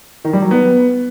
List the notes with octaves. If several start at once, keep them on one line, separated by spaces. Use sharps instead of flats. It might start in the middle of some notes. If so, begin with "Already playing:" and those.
D#3
G3
F#3
B3